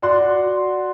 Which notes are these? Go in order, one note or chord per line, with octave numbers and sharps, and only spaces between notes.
F#4 D5 F#5 C6 F#6